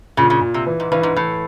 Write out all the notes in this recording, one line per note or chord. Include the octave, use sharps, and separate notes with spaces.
A#2 C#3
C#3
A#2
C3
E3
G#2
G2 E3
G#2
A2 E3